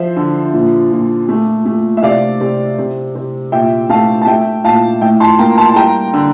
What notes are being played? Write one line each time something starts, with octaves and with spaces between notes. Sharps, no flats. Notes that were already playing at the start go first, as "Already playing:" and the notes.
Already playing: F3 C5 E5
D3
A#2
A#2
A3
A3
E5
C3 D5 F5
C3
C3
C3
A#2 E5 G5
A3 F5 A5
A5
A3 E5 G5
A#2 F5 A5
A2 E5 G5
A5 C6
A#3 G5 A#5
A5 C6
A5
G3 G5 A#5
D3